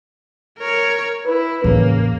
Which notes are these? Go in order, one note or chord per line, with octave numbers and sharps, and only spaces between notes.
A#4 C#5
E4 B4
A1 E2 C#3 A#3